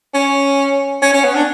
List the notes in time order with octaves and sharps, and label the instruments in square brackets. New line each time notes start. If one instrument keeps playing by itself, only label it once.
[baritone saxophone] C#4
C#4
C#4
B3
D4